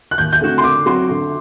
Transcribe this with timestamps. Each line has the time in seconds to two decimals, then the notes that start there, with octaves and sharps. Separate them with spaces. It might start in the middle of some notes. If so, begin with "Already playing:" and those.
0.11 F#6
0.18 D#2 G6
0.33 G6
0.40 D3 A3 C4 F#4
0.58 C6
0.64 D3 D6
0.86 F#3 C4 F#4 C6
1.09 D3